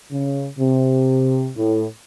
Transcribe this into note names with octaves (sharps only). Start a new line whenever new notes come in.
C#3
C3
A2